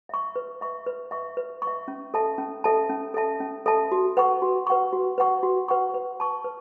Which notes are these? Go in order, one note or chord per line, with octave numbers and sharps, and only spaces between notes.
E5 C#6
B4
E5 C#6
B4
E5 C#6
B4
C#6
E5
C#4
A4 E5 A5
C#4
A4 E5 A5
C#4
A4 E5 A5
C#4
A4 E5 A5
F#4
B4 F#5 C#6
F#4
B4 F#5 C#6
F#4
B4 F#5 C#6
F#4
B4 F#5 C#6
B4
A5 C#6
B4